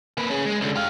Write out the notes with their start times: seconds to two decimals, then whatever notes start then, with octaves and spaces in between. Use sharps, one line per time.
0.18 A#3 B4
0.29 C#4 G#4
0.46 G#3
0.61 C#2 D3
0.76 G4 F5